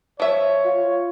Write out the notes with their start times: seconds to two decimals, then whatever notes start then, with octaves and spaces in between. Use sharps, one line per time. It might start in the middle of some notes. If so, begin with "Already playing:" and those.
0.20 F3 C#5 E5
0.65 F4